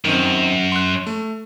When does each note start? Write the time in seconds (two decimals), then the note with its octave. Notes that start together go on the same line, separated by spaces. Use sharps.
0.05 F#2 D#3 C4
0.72 C6 F#6
1.07 A3